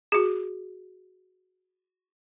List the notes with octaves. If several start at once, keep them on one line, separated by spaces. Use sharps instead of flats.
F#4 G#4